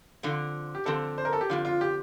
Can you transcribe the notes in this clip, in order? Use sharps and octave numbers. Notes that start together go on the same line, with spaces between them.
D3 F3 C4
G4
D3 F3 C4 A4
C5
A#4
A4
G4
D3 F3 C4 F4
F4
G4